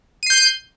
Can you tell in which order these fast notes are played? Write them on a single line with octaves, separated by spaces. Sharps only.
D#7 C7 G6